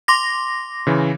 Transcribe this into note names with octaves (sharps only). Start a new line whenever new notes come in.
C6 D6 A#6
C#3 E3